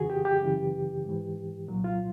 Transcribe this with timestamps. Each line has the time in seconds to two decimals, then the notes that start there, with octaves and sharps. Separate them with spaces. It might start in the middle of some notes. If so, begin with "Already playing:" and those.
Already playing: F2 C#3 E3 F#4 G#4
0.10 G4
0.25 G4
0.41 F#2 C#3 E3
1.05 G#2 E3
1.68 C2 A#2 F#3
1.84 F4